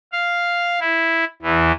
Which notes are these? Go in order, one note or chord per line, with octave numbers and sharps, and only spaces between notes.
F5
E4
E2 E3